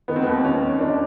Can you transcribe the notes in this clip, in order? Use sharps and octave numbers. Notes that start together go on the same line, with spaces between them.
D#3 B3
C4
D#2 B3
D#2 C#4
D#3
D#3 D4
D4